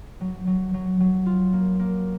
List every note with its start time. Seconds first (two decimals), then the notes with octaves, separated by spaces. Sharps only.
0.21 F#3
0.47 F#3
0.74 F#3
1.00 F#3
1.26 F4
1.53 A#3
1.79 A#3